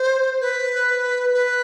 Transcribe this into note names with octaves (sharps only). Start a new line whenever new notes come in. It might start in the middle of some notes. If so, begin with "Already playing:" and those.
Already playing: C5
B4
B4